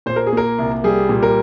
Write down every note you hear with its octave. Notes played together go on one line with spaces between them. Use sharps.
A#2 C5
A#4
G#4
A#3 A#4
C2
G3 G#4
A#2
A#4